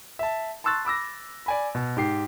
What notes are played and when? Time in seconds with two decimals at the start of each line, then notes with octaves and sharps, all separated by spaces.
0.19 E5 A5
0.64 A5 C6 C#6 E6 F#6 A6
0.85 B5 D6 E6 A#6
1.46 D5 G#5 B5
1.75 B2
1.96 G#2 G4 C7